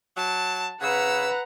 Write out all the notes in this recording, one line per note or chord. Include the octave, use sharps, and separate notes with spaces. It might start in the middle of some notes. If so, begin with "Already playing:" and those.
F#3 A5
C#3 B4 F#5 A#5 E6